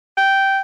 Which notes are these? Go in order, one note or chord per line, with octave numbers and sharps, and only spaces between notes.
G5